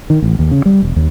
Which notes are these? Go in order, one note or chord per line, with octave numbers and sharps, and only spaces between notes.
D#3
A1
D#2
C#3
G3
E1
D#2